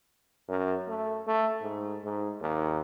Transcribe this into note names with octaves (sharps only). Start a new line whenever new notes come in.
F#2
A3
A3
G#2
G#2
D#2